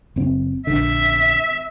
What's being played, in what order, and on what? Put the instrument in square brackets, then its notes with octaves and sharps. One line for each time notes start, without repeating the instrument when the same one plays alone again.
[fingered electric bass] F#1 C4
[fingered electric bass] A#1 D3 [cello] E5